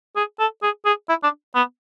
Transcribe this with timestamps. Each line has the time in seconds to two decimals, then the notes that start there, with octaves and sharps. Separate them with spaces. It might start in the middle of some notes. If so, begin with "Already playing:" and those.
0.16 G#4
0.39 A4
0.63 G#4
0.85 G#4
1.09 E4
1.23 D4
1.55 B3